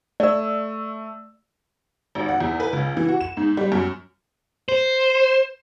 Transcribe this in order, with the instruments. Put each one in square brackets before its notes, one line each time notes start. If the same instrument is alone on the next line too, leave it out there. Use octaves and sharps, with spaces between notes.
[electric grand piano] A3 E6 [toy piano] D5
[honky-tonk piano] G#1
F#5
E2
B4
C#2
E3
F#4
E7
G#2
G3
F#2
[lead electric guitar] C5